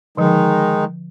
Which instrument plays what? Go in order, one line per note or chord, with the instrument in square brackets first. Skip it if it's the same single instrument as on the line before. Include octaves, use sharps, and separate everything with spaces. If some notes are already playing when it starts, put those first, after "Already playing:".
[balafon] D3 F3 [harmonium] D#3 G#3 D#4